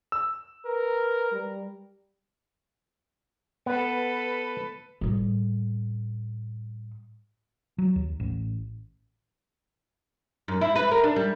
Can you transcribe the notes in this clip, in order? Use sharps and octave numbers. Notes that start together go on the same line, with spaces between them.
E6
A#4 B4
G3
B3 A4 B4
A2 G3
F#3
D#2
A1
F#2
E4
B4
A#4
D4
G3